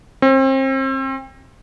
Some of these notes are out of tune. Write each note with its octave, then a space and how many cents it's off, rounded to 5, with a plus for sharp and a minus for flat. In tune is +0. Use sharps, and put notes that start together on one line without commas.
C4 +35